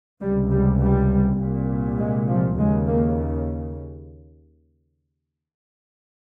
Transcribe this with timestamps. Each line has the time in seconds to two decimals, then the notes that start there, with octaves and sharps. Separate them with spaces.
0.21 C#2 C3 G3
0.51 G3
0.81 G3
1.40 C2 A#2
1.99 G#3
2.28 F3
2.58 D#2 C#3 G#3
2.87 A#3